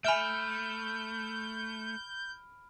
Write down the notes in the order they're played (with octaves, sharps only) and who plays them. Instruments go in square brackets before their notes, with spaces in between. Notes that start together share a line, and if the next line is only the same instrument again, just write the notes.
[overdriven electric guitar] A3 [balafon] E5 G#5 [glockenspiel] B5 F6 D7 [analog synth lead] G6